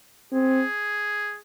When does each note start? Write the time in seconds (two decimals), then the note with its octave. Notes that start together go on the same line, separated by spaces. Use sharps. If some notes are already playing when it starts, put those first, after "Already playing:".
0.32 C4 G#4